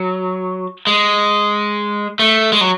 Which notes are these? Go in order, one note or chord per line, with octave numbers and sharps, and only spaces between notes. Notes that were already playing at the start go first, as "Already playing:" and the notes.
Already playing: F#3
G#3
A3
G#3
F#3